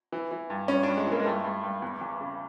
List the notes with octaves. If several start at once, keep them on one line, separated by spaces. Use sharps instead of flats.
E3
E3
G2
G2 C#4
G2 D4
G#3
E3 A#3
G#3
G2 A3
G2
G2
E2
E2
C#3